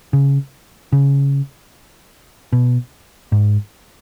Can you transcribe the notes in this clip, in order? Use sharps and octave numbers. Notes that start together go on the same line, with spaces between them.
C#3
C#3
B2
G#2